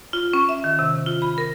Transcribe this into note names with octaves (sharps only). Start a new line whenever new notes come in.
F4
C#4
E5
D#3
C3
F4
B5
A#4